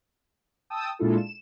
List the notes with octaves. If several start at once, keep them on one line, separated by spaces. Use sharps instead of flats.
G5 A5 D#6 E6
A#2 G#3 D4 E4 F4 A4
E7